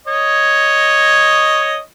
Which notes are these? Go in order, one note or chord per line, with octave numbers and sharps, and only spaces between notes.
C#5 D#5